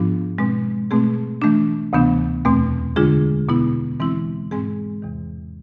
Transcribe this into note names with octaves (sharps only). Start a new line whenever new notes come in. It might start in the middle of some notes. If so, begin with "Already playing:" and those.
Already playing: G#2 F3 B3 D4 F4
B2 G#3 C4
B2 A3 C4 G#4
E3 A3 D4
D2 C3 E3 B3 D4
E2 B2 A3 C4
D3 G#3 D4 F4 G#4
B2 B3 E4
E3 G#3 C4 E4
G#2 G#3 C4 G#4
E2 C3 E3